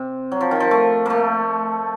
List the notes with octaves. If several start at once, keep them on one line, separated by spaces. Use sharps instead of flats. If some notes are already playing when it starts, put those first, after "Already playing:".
Already playing: C3
F#3
F3
D#3
F3
A3
A3 A#3